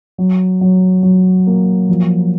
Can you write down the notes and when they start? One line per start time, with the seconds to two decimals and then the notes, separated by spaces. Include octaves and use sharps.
0.18 F#3
0.61 F#3
1.03 F#3
1.47 A#3
1.89 F3